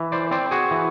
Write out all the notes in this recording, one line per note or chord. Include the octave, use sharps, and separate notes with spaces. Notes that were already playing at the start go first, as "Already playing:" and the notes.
Already playing: E3
C5 D5
C4 C5 D5
F#4 G#4
E3